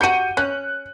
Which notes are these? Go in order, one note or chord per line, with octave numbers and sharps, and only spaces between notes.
F#4 G4 G6 C#7 D#7
C#4 F#6